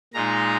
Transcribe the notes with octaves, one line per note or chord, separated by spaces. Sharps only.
A#2 G#3 D#4 A#5